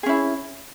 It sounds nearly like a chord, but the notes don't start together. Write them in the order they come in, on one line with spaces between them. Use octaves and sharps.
G#4 C#4 E4